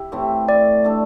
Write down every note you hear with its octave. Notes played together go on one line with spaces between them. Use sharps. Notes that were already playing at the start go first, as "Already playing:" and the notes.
Already playing: E4 G4 E5
A2 E3 A3 C4
D5
A3 D4 A4